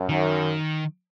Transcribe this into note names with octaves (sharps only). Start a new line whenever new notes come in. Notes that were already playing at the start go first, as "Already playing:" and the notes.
Already playing: F#2
D#3